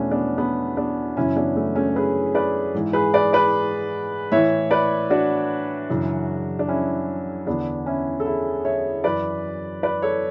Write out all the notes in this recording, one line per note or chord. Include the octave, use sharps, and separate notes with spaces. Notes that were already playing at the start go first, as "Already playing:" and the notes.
Already playing: E2 B2 A3 B3 C#4 D4
B3 D4
B3 D4
B3 D4
F#2 C#3 E3 C#4 E4
B3 D4
A3
A3 C#4
C#5
G#4 B4
B4 D5
G#2 E3
G#4 B4
B4 D5
B4 D5
A2 E3 C#5 E5
B4 D5
D4 F#4
F#2 C#3 E3
D4
C#4 E4
E2 D3 B3 D4
C#4 E4
A4
E4 G#4
C#5 E5
F#2 E3 B4 D5
B4 D5
A4 C#5